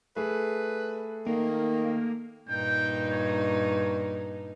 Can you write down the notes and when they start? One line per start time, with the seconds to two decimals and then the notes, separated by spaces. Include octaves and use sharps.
0.16 A3 G#4 B4
1.26 D#3 A#3
2.49 G2 A#2 D#4 G5
3.11 C#5